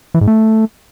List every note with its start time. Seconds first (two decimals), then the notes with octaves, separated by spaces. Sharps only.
0.14 E3
0.21 G#2
0.28 A3